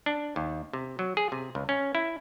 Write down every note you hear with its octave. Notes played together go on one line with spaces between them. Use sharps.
D4
D#2
C3
F#3
G#4
C3
C#2
C#4
E4